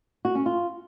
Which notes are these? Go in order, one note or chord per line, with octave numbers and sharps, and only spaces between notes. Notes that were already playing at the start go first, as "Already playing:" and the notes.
F#4
C#4
F4